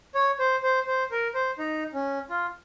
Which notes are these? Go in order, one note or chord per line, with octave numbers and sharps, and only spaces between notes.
C#5
C5
C5
C5
A#4
C5
D#4
C#4
F4